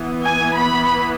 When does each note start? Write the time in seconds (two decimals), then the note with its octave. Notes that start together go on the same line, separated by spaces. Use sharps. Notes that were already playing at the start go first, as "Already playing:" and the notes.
Already playing: E3 B3
0.21 G#5
0.53 B5